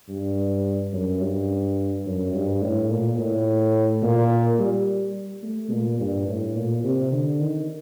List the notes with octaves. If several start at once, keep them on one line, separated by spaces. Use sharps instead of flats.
G2
F#2
G2
F#2
G2
A2
A#2
A2
A#2
G3
A3
A#2
G2
A2
A#2
C3
D3
D#3